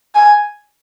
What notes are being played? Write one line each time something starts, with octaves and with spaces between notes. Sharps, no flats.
G#5